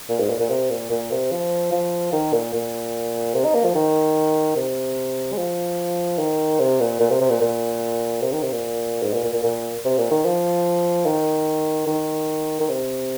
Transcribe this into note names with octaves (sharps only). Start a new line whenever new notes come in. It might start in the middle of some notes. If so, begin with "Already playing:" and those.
A#2
G#2
A#2
A#2
C3
A#2
A#2
C3
F3
F3
D#3
A#2
A#2
C3
D#4
A#3
F3
D#3
C3
G#3
F3
D#3
C3
A#2
A#2
C3
C3
A#2
A#2
C3
D#3
C3
A#2
G#2
A#2
A#2
A#2
A#2
C3
A#2
D#3
F3
D#3
D#3
D#3
C3